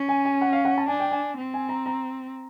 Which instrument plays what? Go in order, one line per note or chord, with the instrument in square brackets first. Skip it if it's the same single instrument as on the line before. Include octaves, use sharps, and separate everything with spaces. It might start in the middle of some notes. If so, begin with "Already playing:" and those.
Already playing: [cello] C#4
[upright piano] G#5
G#5
F#5
F5
F#5
A5
[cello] D4 [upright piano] G#5
[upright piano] G5
G#5
[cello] C4
[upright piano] G#5
A#5
A#5